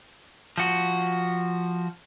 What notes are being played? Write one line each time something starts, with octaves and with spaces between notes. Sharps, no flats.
F3 F#4